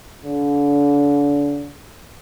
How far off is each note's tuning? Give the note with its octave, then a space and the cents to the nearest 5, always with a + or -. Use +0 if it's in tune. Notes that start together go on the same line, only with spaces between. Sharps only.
D3 -35